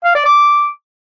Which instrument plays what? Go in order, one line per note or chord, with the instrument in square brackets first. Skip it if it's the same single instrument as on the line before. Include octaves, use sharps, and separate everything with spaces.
[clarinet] F5
D5
D6